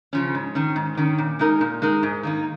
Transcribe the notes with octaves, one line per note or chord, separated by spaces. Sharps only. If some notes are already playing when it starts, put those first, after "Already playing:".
C#3 F3 C#4
G#2
D#3 C#4
G#2
D#3 C#4
A#2
G#3 D#4 A#4
A#2
G#3 D#4 A#4
G#2
D#3 A#3 D#4